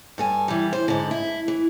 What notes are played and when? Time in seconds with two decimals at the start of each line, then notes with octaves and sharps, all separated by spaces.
0.18 G2 A4 G#5
0.48 E3 G3
0.73 C5
0.88 G#2 D3
1.11 E4
1.48 E3